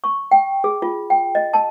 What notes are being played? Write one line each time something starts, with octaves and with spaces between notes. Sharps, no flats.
C#6
G5
G#4
F4
G5
D#5
A5